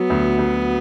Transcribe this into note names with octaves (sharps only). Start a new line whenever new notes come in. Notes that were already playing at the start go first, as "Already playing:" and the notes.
Already playing: F#3 B3
D2
D2